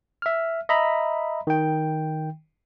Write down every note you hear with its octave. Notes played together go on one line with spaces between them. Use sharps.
E5 F6
D#5 E5 A#5 B5
D#3 G5